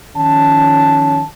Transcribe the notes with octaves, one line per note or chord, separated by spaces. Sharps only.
D#3 F3 C#4 A5